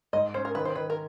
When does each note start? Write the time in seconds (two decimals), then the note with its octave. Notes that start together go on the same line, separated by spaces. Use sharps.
0.13 G#2 D#5
0.34 C#4 C5
0.45 A#4
0.55 D#3 B4
0.65 C5
0.75 D#3 B4
0.90 A#4